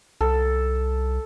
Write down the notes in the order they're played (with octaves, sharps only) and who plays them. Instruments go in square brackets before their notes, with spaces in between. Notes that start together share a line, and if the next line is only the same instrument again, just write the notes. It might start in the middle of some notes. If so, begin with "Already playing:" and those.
[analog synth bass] C2 [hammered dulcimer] A4